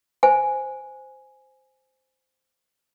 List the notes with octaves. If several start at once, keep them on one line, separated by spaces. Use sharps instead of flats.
C5 G#5